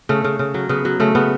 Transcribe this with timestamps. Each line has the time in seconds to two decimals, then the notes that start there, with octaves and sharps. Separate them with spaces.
0.09 C#3 A3
0.24 C#3
0.39 C#3
0.54 F#3
0.69 C#3 B3
0.85 F#3
1.00 C#3 A3
1.15 C#3 B3